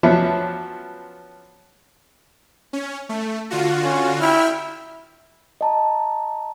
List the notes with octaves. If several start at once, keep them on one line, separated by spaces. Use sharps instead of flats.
F3 F#3 B3 C#4 D4 E5
C#4
A3
D3 F4 F#4
C#4
E4 E5 G5 F6
D#5 A5 A#5